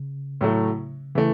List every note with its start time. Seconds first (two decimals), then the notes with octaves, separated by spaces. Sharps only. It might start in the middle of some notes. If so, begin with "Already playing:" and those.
Already playing: C#3
0.41 A2 F#3 A3
1.15 C#3 E3 A3